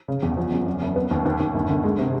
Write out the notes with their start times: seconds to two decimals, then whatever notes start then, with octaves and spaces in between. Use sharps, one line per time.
0.08 C#3
0.23 E2
0.37 F3
0.52 F#2
0.66 F#2
0.82 F#1
0.96 B3
1.11 D#2
1.25 D#2
1.40 D#2
1.55 G1
1.70 D3
1.84 G#3
1.99 C3